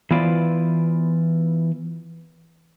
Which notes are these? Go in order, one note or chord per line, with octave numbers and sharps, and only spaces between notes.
E3 B3 E4 F4 C5 D5